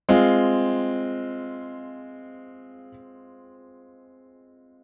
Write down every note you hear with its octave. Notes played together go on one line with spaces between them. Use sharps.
G#3 C4 F4